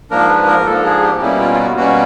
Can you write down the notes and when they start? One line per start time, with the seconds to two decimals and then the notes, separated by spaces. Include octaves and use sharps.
0.10 G#2 F3 A#3 D4 A#4
0.29 B4
0.47 A#4
0.66 G#2 F3 A#3 D4 A4
0.85 G#4
1.03 G4
1.21 B2 G3 A#3 C#4 E4
1.40 F4
1.54 F4
1.59 F#4
1.77 B2 G3 A#3 C#4 F#4